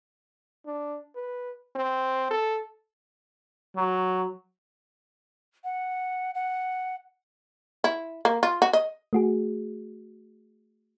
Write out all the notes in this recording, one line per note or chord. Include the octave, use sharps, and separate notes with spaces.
D4
B4
C4
A4
F#3
F#5
F#5
E4
A#3
F4
F#4
D#5
A3 F#4 G#4